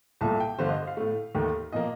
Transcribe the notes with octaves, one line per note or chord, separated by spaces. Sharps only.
C2 A#2 A3 A5
G5
G2 D3 A3 C5
D#5
F5
A2 A3
D#2 D#3 A3
A#2 F3 A#3 D#5